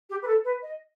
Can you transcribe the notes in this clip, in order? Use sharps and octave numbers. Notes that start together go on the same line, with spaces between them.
G4
B4
A4
B4
D#5